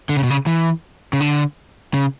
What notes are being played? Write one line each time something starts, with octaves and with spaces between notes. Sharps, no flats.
D3
C#3
B2
C#3
E3
C#3
D3
C#3